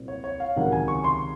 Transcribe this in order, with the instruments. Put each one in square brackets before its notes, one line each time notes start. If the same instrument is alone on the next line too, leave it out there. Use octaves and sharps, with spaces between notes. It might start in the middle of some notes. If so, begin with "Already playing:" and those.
Already playing: [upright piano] C2 A#2 F#3 C4
[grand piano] C#5
C#5
F5
[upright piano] C#2 C3 D#3 F#3 C#4 [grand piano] F#5
[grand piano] G#5
C#6
C6